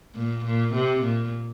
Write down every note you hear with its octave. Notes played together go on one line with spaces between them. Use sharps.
A#2
A#2
C3
A#2